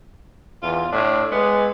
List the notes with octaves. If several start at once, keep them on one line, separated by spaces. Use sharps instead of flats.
E2 F4
A2 D4
G#3 B3